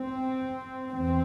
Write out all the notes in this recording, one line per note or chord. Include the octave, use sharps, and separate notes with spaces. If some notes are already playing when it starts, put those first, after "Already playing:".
Already playing: C4
E2 C4